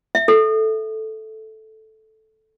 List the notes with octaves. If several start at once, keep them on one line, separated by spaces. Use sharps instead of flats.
E5
A4